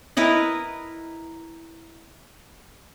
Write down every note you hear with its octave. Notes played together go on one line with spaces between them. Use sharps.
E4 A#4 B4 D#5